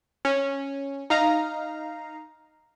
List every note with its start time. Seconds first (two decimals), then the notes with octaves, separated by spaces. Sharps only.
0.25 C#4
1.10 D#4 F5 A#5